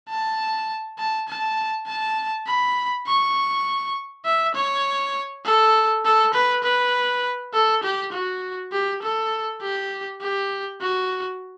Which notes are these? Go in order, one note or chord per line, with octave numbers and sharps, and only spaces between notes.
A5
A5
A5
A5
B5
C#6
E5
C#5
A4
A4
B4
B4
A4
G4
F#4
G4
A4
G4
G4
F#4